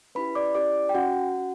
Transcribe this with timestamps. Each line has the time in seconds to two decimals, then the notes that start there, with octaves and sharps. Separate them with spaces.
0.15 C#4 E4 G4 B4 B5
0.35 D5 D6
0.55 C#4 E4 G4 D5 D6
0.89 G5
0.94 C#4 F#4 F#5
1.35 C#4 F#4